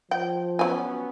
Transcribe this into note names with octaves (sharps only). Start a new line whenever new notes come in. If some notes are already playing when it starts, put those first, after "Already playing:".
F3 G5
F#3 B3 C#4 G#5